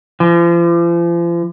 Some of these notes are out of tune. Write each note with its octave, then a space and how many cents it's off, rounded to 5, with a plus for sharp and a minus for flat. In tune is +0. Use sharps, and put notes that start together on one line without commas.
F3 -40